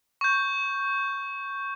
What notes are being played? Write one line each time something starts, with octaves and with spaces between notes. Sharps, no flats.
C#6 G6